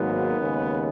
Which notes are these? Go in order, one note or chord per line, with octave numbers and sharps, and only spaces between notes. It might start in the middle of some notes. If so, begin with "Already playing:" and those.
Already playing: G#1 G#2 F#3 A#3 B3
D#2 C#3 G#3